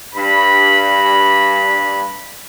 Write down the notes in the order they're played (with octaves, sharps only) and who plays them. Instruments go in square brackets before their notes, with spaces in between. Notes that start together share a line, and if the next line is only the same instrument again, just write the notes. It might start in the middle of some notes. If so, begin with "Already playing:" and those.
[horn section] G2 B5